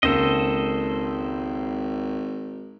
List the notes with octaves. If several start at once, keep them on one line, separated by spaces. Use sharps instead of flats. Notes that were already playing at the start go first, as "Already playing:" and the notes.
G#1 C#2 A#3 A4 C5 D#5 E6